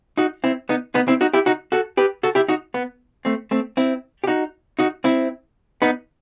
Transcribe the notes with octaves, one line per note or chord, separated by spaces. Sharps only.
D#4 F#4
C4 E4
B3 D#4
B3 D#4
C4 E4
D#4 F#4
E4 G4
D#4 F#4
F#4 A4
G4 B4
F#4 A4
E4 G4
D#4 F#4
B3
A3 C4
A3 C4
C4 E4
G4
D#4 F#4
D#4 F#4
C4 E4
B3 D#4